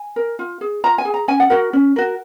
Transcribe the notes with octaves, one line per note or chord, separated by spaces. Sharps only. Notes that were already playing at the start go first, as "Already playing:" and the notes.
Already playing: G#5
A#4
F4
G#4
F4 A#5
G#5
G#4
A#5
C#4 G#5
F#5
F#4 A#4 F#5
C#4
F#4 A#4